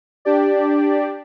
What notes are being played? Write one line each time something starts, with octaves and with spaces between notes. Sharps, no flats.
D4 G4 D5